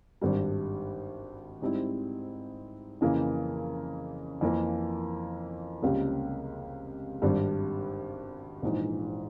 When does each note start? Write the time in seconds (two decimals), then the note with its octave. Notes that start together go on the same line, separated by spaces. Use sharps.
0.21 G#1 G2 G3
1.62 G#2 G3 C4 E4
3.01 F2 C#3 E3 A#3 E4
4.41 F2 E3 A#3 F4
5.82 C#2 C3 G3 A#3 C#4
7.22 G#1 G2 G3
8.62 A#1 G#2 E3